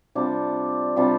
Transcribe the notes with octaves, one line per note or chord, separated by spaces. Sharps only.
C3 G3 D4 F4
C3 G3 D4 F4